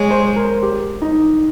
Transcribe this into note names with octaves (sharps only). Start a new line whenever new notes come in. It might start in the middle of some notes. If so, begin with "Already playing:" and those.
Already playing: G#3 C#5
C5
A#4
G4
D#4